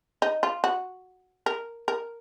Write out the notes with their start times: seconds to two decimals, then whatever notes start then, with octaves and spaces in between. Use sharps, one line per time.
0.22 D#4
0.43 F4
0.64 F#4
1.46 A#4
1.88 A#4